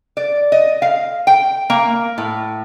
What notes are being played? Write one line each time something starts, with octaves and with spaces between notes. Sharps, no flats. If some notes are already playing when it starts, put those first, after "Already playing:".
D5
D#5
F5
G5
A#3
A2